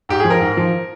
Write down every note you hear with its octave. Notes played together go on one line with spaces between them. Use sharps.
G#2 G4
G#4
F3
A#4
G#2
F3